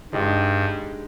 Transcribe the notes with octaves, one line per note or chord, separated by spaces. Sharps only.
G2 D3 G#3 D#4 G4